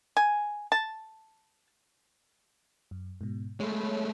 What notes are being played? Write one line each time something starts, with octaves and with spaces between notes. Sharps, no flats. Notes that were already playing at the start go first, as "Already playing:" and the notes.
G#5
A5
F#2
G#2 B2
G#3 A3 C#5 B5